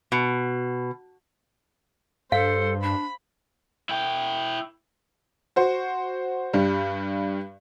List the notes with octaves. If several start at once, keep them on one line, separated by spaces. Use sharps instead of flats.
B2
G2 A4 C5 F5
D4 B5
E4 G5
F#4 C5
G2 G3